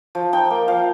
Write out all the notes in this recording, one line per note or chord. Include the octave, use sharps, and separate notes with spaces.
F3
D#4 G5
A#3
F3 F5